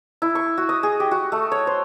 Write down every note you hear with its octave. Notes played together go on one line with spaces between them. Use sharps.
E4
C#6
F#4
D#5
G#4
G4
F#4
A3
C#5
C5